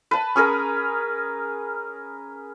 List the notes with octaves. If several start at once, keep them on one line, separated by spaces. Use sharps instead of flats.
B4 A5
C#4 G#4 A#4 B4